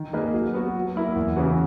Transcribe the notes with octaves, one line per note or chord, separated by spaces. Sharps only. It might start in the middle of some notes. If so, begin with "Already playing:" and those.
Already playing: D#3
A#3 D#4 G#4 B4
F#3
B3 F#4
F#3
A#3 E4 A#4
E2
C#3 E3 B3 F#4